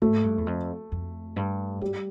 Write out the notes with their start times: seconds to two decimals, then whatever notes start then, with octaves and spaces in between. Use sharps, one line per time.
0.02 G#2 A3
0.23 G2
0.38 E2
0.47 F2
0.92 F2
1.36 G2
1.81 G2 G3